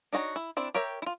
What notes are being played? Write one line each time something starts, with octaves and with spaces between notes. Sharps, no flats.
D4 D#4 F#4 C#5
E4
C4 D4 E4
G4 A#4 C#5 E5 G5
E4 F4